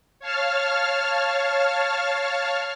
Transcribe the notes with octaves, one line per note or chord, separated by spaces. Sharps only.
C#5 F5 A5 F6